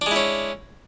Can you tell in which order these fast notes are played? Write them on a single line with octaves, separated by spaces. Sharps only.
D4 G#3 E4 C#4